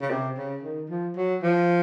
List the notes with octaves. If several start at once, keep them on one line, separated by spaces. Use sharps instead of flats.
C#3
C3
C#3
D#3
F3
F#3
F3